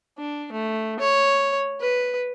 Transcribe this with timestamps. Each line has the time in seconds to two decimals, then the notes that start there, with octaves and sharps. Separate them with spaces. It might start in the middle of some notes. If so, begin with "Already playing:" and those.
0.19 D4
0.52 A3
1.00 C#5
1.81 B4